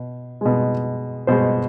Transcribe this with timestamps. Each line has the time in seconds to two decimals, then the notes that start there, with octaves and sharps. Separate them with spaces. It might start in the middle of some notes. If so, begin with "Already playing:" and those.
Already playing: B2
0.41 B2 G#3
1.27 B2 G#3 C5